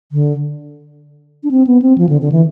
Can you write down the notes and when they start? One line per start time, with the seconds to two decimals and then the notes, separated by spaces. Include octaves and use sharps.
0.12 D3
1.43 D4
1.51 C4
1.67 B3
1.82 C4
1.98 F3
2.09 D3
2.21 D3
2.32 E3